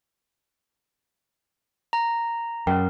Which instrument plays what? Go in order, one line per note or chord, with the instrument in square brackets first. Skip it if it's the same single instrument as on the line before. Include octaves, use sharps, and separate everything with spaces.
[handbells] A#5
[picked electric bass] F#2 [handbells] A#4 [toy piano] C#5 G5